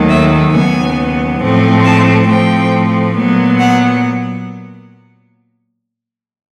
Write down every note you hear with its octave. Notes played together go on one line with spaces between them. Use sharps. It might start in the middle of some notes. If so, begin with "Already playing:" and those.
Already playing: D#2 D#3 F#3 A3
E5
D#2 C#3 F#3 B3 G#5
A2 F3 A3 C4
A5
A2 F3 A3 C4 G5
A#2 F#3 B3
F#5